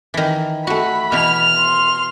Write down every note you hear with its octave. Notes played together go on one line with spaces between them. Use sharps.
D#3 E3
A3 F#4 B5
B2 E3 F6 F7
C6